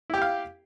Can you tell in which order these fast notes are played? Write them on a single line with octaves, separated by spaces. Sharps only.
E4 G4 G5 F5